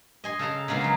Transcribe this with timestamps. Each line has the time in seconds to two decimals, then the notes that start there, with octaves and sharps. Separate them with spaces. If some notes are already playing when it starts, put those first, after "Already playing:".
0.24 D#5 G#5 C6
0.39 C#3 A4 A5 A#5 C6
0.68 C#3 G#3 A#3 B3 F4
0.81 F#3 G#4